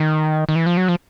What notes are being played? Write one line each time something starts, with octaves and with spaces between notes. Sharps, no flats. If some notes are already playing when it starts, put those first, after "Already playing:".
Already playing: D#3
D#3
E3
F3
F#3
F3